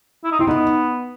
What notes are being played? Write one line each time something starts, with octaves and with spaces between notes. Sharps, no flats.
E4
D#4
C4 E4
B3 D#4